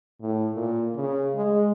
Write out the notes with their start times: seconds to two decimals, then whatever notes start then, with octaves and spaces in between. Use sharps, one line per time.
0.21 A2
0.55 A#2
0.95 C#3
1.36 G#3